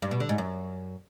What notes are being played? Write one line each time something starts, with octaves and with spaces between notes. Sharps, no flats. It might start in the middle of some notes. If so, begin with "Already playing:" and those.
G2
B2
D3
G#2
F#2